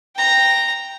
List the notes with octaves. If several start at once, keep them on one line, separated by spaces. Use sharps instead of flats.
G5 A#5